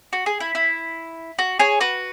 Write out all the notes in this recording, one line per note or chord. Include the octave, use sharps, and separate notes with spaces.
F#4
G#4
E4
E4
F#4
G#4 C#5
F#4 B4